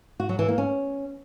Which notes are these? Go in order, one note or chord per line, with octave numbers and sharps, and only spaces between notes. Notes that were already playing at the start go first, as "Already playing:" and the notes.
F#4
F#3
E3
A#3
C#4